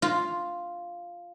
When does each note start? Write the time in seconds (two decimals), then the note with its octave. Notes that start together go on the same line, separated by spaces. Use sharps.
0.02 F4